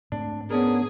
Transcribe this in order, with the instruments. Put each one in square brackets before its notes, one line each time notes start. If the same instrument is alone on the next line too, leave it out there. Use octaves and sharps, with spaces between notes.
[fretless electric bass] G#2 A3 C4 [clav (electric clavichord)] D4
[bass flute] B3 [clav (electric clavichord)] C#4 D4 A#4 [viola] G#4